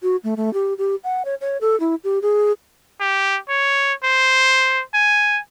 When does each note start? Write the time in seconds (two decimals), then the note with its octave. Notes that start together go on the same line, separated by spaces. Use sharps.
0.03 F#4
0.24 A3
0.37 A3
0.54 G4
0.78 G4
1.04 F#5
1.25 C#5
1.41 C#5
1.61 A4
1.80 E4
2.04 G4
2.22 G#4
3.00 G4
3.48 C#5
4.03 C5
4.94 G#5